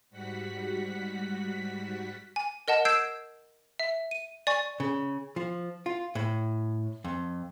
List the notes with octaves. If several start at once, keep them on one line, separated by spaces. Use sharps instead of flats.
G#2 G3 F#4 F#5 B6
G#5
A#4 D#5 F#5 A5
E6 G6 G#6 C7 D7 E7
E5
D#7
D5 G#5 C#6
C#3
F3
F4
A2
F2